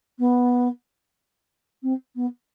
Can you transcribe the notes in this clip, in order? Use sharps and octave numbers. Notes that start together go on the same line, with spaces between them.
B3
C4
B3